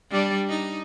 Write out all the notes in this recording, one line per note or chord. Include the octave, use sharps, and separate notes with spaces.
G3 D4 D5
D#4